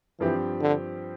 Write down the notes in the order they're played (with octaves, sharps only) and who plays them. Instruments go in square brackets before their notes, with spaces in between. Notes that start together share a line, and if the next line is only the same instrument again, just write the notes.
[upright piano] G2 F3 C4 G4 [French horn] E3
[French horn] D3